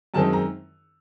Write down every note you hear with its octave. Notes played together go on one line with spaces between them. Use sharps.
F#2 D#3 G#3 C4 D#4 A5
A#5